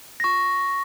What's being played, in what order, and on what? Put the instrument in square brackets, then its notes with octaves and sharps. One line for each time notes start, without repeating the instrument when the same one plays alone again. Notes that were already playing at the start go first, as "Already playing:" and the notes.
[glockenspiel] C#6 A#6